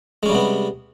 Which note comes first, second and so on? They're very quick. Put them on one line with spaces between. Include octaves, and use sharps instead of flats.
G#3 C#4 G3 C3 B3